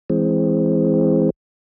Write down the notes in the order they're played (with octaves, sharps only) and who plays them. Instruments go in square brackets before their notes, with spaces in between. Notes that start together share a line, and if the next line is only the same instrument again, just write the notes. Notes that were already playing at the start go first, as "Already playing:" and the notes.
[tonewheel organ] E3 G#3 C4